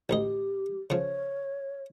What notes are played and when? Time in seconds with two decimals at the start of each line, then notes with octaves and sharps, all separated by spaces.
0.10 A1 D2 G4 D#5
0.90 C#3 F3 C#5